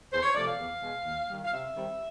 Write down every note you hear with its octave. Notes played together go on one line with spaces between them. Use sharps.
E2 C5
C#5
C3 F3 A3 D5
F5
E2
B2 G#3
D#2
D#3 G3
F5
C3 E5
D#3 G3 C4